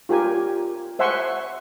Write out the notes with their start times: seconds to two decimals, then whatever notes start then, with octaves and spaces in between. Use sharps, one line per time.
0.09 F4 G4 A#4 G#5
0.99 C5 E5 F#5 G#5 C6 C#6